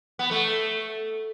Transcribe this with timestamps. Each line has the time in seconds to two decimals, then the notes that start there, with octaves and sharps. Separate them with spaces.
0.19 B3
0.31 A3